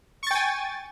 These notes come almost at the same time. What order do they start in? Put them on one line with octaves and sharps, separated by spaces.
C#6 A6 G5 G#5